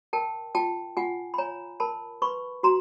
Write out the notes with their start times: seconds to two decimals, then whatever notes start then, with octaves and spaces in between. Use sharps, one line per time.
0.13 A#4 G5 A5
0.55 F4 G5 A5
0.97 F4 F#5 G#5
1.34 B5
1.38 C#5 G#5 A#5
1.80 A#4 A5 B5
2.22 B4 B5 C#6
2.63 F#4 A#5 C6